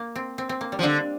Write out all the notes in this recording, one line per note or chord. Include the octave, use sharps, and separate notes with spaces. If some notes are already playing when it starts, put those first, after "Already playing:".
Already playing: A#3
C4
C4
C4
A#3
G3
F3
D3 C4